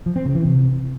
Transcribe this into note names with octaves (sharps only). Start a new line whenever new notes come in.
F3
C4
C#3
E3
C3